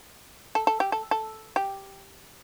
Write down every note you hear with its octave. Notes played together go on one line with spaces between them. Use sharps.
A4
A4
G4
A4
A4
G4